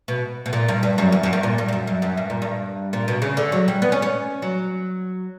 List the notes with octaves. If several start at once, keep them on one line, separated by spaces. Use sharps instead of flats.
B2
B2
A#2
G2
G2
F#2
E2
F#2
G2
A#2
G2
G2
F#2
F#2
F#2
G2
A#2
G2
A#2
B2
C#3
D3
F#3
G3
B3
C#4
C#4
F#3